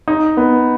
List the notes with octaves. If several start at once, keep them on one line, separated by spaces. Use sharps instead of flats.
D#4
B3